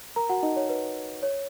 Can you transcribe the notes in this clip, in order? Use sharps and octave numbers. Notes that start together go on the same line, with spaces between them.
A#4 A#5
F#4 F#5
D#4 D#5
C#5
B4
C#5